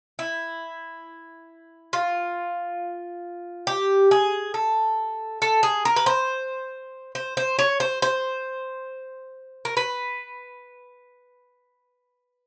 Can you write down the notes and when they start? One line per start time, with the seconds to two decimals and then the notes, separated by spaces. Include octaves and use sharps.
0.19 E4
1.93 F4
3.67 G4
4.11 G#4
4.54 A4
5.42 A4
5.63 G#4
5.85 A#4
5.96 B4
6.06 C5
7.15 C5
7.37 C5
7.59 C#5
7.80 C5
8.02 C5
9.65 A#4
9.77 B4